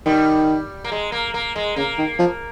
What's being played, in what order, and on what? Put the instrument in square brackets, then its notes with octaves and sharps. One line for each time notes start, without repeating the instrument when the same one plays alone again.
[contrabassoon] D#3 [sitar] G3
[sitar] A#3
G#3
A#3
A#3
G#3
[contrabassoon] C#3 [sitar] A#3
[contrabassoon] D#3
F3